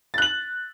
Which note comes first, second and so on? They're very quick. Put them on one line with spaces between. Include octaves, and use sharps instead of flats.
A6 F#6 F#7